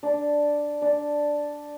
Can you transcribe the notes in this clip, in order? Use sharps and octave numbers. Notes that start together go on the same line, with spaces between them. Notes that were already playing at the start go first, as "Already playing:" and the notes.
D4
D4